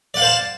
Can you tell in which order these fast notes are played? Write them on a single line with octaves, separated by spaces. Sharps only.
D5 F#5 F5 C5 A5